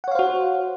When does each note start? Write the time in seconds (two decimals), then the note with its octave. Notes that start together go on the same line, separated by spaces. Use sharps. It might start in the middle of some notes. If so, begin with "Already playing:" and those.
0.04 F#5
0.08 C#5
0.11 F5
0.15 C5
0.19 F#4